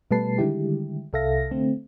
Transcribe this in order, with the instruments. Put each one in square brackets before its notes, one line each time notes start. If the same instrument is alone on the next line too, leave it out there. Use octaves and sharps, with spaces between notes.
[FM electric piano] B2 G3 A3 B4 A5 C7
D3 D#3 G3 G#3 E4 G4
C2 C3 A4 E5 F5 A#6
D3 A3 C4